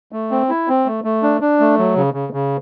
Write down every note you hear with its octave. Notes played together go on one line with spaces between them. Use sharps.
A3
C4
E4
C4
A3
A3
D4
D4
A3
F#3
C#3
C#3
C#3